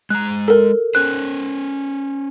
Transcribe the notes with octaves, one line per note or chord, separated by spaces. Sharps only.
G#3 A#5 F#6
A4 A#4
C#4 C5 F#6